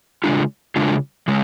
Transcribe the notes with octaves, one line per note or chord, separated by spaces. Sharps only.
C#3 G#3 D4 F4
C#3 G#3 D4 F4
C#3 G#3